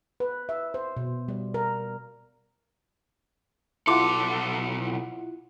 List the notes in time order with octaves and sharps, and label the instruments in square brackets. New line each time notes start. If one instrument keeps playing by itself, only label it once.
[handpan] B4
E5
C5
B2
G3
A#4
[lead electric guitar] B1 A4 [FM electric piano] E4 F4 F#5 [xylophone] C6 D6